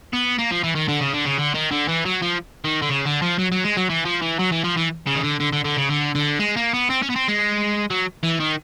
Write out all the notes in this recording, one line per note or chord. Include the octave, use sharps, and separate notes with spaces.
B3
A#3
F3
E3
D#3
D3
C#3
D3
C#3
D3
D#3
D3
E3
F#3
F3
D#3
D3
C#3
D3
F3
F#3
F#3
G#3
F#3
E3
F3
E3
F#3
E3
F3
E3
C#3
D#3
D3
D3
D3
D3
C#3
D3
D3
G#3
A#3
B3
C4
C#4
B3
C4
G#3
F#3
E3
D#3